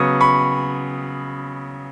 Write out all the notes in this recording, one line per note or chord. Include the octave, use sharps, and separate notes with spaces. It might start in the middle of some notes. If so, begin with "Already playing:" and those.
Already playing: C#3 F#3 B3 C#6 D#6
B5 C#6